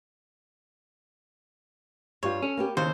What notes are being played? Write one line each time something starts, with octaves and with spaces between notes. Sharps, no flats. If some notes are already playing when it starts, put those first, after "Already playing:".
G2 G3 F4 C#5
C#4 A4
A#3 B3 G4
D#2 C#3 E4 C5 F5